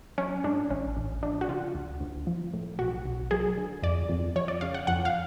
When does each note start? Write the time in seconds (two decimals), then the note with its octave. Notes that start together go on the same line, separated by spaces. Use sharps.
0.18 F#3 C#4
0.44 G#2 D4
0.70 A1 C#4
0.97 A1
1.22 F3 D4
1.41 F#4
1.48 C#3 F4
1.74 D2
2.00 D2
2.27 F3
2.53 A2
2.78 B1 F#4
3.05 B1
3.31 F#3 G#4
3.57 D3
3.83 F2 D5
4.09 F2
4.36 F3 C#5
4.48 D5
4.61 C#3 F5
4.74 F#5
4.87 F2 F#5
5.05 F5